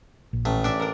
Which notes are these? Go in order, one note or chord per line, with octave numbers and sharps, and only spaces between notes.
A#1
A1 A3
D4 E5
D4 A#4